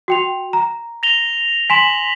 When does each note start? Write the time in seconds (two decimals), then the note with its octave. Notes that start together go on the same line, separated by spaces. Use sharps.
0.08 F#4 G5 F7
0.53 A#5
1.03 A#6 F7 G7
1.70 G#5 C6 B6 E7 F#7